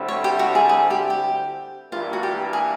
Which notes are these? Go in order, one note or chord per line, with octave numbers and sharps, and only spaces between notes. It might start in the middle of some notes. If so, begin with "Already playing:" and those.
Already playing: D2 D3 G3 C4 E4
C#5
G4
F#4
G#4
G#4
G4
G4
G2 E3 G3 A#3 F4
F#4
G4
G#4